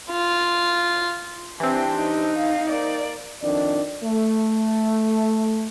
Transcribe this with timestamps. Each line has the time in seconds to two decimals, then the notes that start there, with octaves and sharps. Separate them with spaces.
0.12 F4
1.60 E3 C4 D4 G4
1.95 D#4
2.37 F5
2.69 A#3 D5
3.43 F2 D#3 D4 D5
4.04 A3